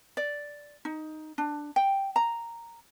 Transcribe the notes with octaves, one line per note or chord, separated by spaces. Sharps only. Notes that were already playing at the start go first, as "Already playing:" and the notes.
D5
D#4
D4
G5
A#5